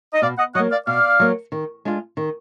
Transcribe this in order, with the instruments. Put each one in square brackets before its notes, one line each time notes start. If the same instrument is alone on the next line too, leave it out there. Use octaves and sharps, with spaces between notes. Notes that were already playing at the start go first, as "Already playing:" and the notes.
[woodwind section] D#5
[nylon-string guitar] B2 [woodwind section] D5 F5
[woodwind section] D#5 F#5
[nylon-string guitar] F#3 A#3 [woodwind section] D#5 F#5
[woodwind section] D5 F5
[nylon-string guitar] B2 [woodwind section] D5 F5
[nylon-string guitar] F#3 A#3
D#3
G#3 D4 F4
D#3